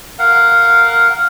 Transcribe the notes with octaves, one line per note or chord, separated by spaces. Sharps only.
A#4 F5 F#5